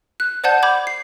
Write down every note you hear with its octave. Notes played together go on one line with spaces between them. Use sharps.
F#6
C5 D5 F#5 A5 G6
B5 D6 G6 G#6
C7